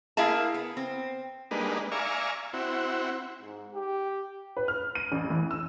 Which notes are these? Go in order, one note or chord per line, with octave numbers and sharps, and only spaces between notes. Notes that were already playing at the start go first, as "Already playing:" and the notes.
A#3 E4 G#4 E5 F5 A5
B3
C4
G3 G#3 A#3 D4 D#4 B4
D5 E5 F5 G#5 A#5 C#6
C4 E4 F#4
G#2
G4
B4
F6
D#7
A1
E3
E6